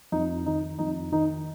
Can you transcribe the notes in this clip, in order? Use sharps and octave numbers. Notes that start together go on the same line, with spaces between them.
F2 D#4
D#3 D#4
F2 D#4
D#3 D#4